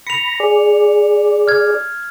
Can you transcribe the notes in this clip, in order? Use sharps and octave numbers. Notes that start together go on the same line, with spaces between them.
B5 A#6 C#7 F7
G#4 D5
F6 G#6